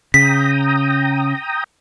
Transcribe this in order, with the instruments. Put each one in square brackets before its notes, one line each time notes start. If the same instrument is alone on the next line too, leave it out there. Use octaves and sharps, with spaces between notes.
[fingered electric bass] C#3 [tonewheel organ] G5 A#5 D#6 [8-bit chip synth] B6